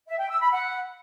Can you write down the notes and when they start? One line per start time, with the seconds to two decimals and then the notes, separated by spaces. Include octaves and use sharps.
0.09 E5
0.19 G5
0.30 E6
0.41 B5
0.52 F#5